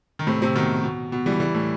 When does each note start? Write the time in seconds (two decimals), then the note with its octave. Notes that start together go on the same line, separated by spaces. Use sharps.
0.19 D#3
0.27 A2 C3
0.41 A2 C3
0.55 B2 D#3
0.84 B2
1.12 B2
1.26 E3 G3
1.40 E3 G3
1.54 A2